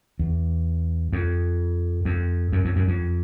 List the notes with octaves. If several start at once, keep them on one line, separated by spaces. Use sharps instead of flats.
E2
F2
F2
F#2
F2
F#2
F2